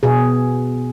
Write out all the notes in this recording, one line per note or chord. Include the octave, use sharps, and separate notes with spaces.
B2 G#4